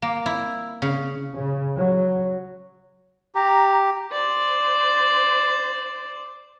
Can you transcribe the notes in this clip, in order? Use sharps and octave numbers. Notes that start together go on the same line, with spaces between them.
A#3
E4
C#3
C#3
F#3
G4 A#5
C5 D5